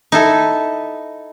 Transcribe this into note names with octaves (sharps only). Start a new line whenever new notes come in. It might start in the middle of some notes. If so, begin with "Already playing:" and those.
D#4 E4 A4